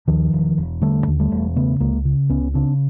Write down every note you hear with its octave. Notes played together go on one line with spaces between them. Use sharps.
D#2 D#3 F3
E1
E1
D3 G3 A3
D#2
G3 A3
E1
C#3 A3 B3
C#2 G#3 A#3
C#3
C#2 B3 C#4
C#3 C4 D4